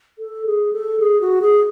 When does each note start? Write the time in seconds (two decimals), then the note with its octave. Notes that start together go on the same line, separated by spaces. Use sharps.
0.19 A4
0.46 G#4
0.73 A4
1.00 G#4
1.21 F#4
1.42 G#4